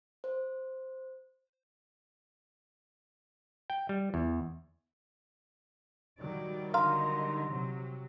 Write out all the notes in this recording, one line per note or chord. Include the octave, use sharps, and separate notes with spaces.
C5
G5
G3
E2
D#3 F#3 G3 D5
D3 D#4 F5 A#5 C6
C3 F#3